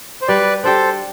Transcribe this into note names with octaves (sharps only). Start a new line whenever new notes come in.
C5
G3 B4 D5
D4 G4 A4 C5